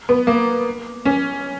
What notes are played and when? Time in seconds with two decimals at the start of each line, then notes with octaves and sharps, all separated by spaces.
0.09 B3
0.27 A#3
1.05 C#4